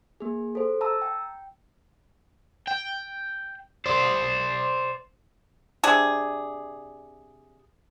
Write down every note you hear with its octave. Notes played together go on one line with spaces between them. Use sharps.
A#3 G#4
A4 C5
A5 A#5 E6
G5
G5
C5 D5
C3 D4 G#4